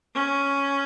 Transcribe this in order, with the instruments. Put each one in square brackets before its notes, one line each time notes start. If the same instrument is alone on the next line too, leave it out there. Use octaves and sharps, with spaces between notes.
[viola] C#4